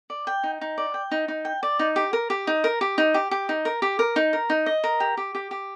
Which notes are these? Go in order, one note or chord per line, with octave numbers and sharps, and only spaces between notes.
D5
G5
D#4
D#4
D5
G5
D#4
D#4
G5
D5
D#4
G4
A#4
G4
D#4
A#4
G4
D#4
G4
G4
D#4
A#4
G4
A#4
D#4
A#4
D#4
D#5
A#4
G4
G4
G4
G4